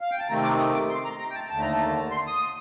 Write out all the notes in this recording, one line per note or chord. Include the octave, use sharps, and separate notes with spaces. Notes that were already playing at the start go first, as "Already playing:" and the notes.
F5
G5
A5
C3 D#3 A3 C4 A#5
D6
D#6
D6
C6
A#5
A#5
G5
A5
D#2 D3 A3 A5
A#5
A5
C6
D#6